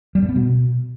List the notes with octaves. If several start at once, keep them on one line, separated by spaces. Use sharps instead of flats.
G3
G2
B3
B2